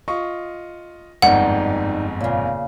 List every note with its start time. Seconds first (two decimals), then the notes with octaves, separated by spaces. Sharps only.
0.08 F4 D#5 C#6
1.22 G1 F2 G#2 G3 D#4 F#5
2.21 A#2 C#3